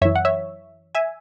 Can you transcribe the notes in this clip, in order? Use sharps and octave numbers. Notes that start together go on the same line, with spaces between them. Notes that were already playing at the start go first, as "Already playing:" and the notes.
F#2 E3 C#5 E5
F#5
C#5 E5
E5 G#5